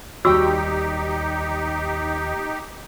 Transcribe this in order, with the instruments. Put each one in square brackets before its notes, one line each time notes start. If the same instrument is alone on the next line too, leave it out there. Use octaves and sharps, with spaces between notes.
[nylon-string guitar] D#2 G3 G5 [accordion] D#4 G4 [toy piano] F#4 C#6 E6